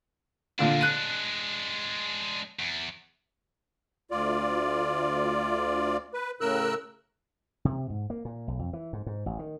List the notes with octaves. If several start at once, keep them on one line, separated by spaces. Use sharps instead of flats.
A#2 D3 G#3 D4 F4
F#6 D#7
E2
D2 F4 D5
B4
A2 C#3 A#4 E6 F#6
C3
G#2
A#3
A#2
B1
F2
E3
G#2
G#2
A1
D#3